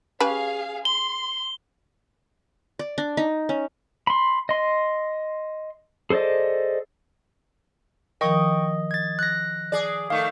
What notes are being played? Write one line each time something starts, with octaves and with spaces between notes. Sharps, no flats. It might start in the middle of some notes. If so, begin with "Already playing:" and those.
C#4 G4 G#4 B4 F5
C6 G7
D5
D4
D#4
C#4
B5 C6
D#5 C6
G#4 A4 C5 D5 D#5
D#3 F3 A#4 D#5 G5 C#6
G#6 A6
F#6 A#6
G#4 D5
D#3 A3 F5